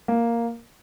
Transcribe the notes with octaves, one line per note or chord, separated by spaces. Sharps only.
A#3